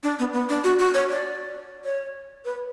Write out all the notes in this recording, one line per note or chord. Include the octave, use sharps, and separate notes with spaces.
D4
B3
B3
D4
F#4
F#4
C#5
D5
C#5
B4